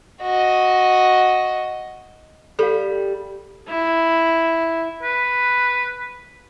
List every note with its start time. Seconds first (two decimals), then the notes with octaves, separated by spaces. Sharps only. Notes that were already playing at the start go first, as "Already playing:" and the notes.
0.22 F#4 D#5
2.59 G3 A4 F5
3.69 E4
5.03 B4